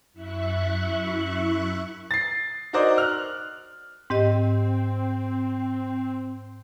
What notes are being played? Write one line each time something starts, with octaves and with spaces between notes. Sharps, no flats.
F#2 E4 E5 C#6 F#6
A6 C7
D#4 F#4 A#4 C5 D5 D#5
F6 F#6
G#2 C4 G4 D#5